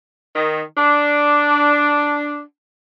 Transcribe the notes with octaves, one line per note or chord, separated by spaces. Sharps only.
D#3
D4